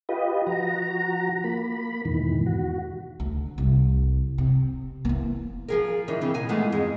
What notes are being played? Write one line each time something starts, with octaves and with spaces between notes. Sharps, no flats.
F4 G4 B4 D#5
F3 F#4 A#5
A#3 B5
E2 G#2 B2 D#3 E3
F#4
D2
C2
C3
E3 A#3
F3 G#4 A#4
D#3 E3 D4
C#3 E3 F3 C4
A#2 D#4 G#5
E3 G#3 A3 B3 F4
F2 G#2 G#4